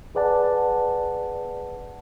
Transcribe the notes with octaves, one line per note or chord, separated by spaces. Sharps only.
G#4 B4 D5 F#5 A5